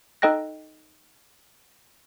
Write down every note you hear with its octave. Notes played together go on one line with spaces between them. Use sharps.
D#4 A4 D#5 G5 F#6 A#6